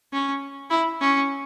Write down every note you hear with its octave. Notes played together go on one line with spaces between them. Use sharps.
C#4
E4
C#4